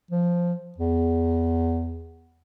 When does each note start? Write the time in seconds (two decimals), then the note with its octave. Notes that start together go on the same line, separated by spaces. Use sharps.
0.11 F3
0.78 E2